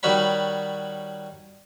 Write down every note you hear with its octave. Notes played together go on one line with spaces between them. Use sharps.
D#3 G3 D#4 F#4 C#5 B5